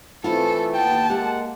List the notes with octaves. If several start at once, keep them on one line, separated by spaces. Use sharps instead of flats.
E3 A3 C4 E4 F4 A4
D#2 B3 G5 A5
G#3 A#3 G4 E5 F#5